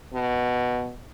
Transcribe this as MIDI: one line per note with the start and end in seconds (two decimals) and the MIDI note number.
0.14 0.93 47